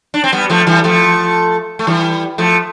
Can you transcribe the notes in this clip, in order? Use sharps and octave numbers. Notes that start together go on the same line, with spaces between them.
D4
C4
G3 B3
F3 A3
E3 G3
F3 A3
A3
E3 G3
F3 A3